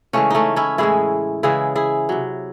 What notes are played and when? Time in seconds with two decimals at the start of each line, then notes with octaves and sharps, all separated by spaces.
0.13 C#3 E3 G#3 A3 C#4
0.30 A3 C#4 D#4
0.56 C#4 E4
0.78 A2 E3 G#3 E4 G#4
1.43 C#3 E3 G#3 E4 G#4
1.75 E4 G#4
2.09 C3 F#3